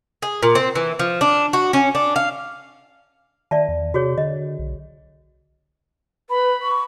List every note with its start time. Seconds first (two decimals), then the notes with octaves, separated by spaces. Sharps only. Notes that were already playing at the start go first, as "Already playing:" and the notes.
0.22 G#4
0.43 A#2
0.55 C4
0.75 E3
0.99 F3
1.21 D4
1.53 F#4
1.73 C#4
1.95 D4
2.16 F5
3.51 D#3 D5 E5 A5
3.68 E2
3.94 C3 F#4 G#4 C#5
4.18 D3 D#5
4.59 B1
6.30 B4 B5
6.62 C#6